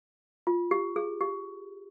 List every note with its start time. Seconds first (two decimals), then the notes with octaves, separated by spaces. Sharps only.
0.47 F4
0.71 G4
0.96 G#4
1.21 G4